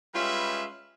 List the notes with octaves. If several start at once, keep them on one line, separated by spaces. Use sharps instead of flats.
G3 G#3 C#4 F4 B4 E5